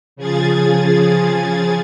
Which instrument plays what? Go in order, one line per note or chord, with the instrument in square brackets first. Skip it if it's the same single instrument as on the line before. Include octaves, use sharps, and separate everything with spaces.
[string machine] C#3 F3 G#4 G#6 A6